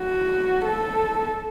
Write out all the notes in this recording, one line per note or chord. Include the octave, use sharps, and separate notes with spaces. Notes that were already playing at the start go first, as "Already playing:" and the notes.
Already playing: F#4
A4